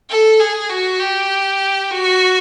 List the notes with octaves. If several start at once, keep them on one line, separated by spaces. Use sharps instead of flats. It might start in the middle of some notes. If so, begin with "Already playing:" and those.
A4
G#4
F#4
G4
F#4